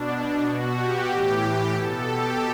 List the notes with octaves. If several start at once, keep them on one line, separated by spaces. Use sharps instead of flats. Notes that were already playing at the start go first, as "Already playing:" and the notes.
Already playing: B2 D4
B2 F#4
G4
A2 E3
B2 A4
G4